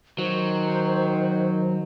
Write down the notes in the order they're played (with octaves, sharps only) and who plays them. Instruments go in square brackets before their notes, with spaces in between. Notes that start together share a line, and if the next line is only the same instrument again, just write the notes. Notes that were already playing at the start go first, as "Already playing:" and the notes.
[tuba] D#3 [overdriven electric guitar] F#3 [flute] C5